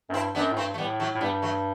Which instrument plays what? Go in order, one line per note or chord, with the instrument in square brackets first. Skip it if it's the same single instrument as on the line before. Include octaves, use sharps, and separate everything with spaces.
[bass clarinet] F#2
[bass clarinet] G2 [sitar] C4 E4
[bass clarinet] F#2 [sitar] B3 D4
[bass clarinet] A2
[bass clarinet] G2 [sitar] A3 C4
[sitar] A3
[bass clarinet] A2 [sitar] G3 B3
[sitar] F#3 A3
[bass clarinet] A2
[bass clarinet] G2 [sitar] G3 B3
[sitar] F#3 A3